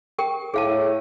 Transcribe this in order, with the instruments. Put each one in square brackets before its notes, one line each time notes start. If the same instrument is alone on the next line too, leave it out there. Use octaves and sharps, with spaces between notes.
[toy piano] G4 A#4 G5
[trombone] A2 [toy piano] G#4 F5 A5